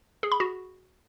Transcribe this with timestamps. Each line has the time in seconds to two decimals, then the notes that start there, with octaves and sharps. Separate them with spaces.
0.23 G#4
0.32 B5
0.40 F#4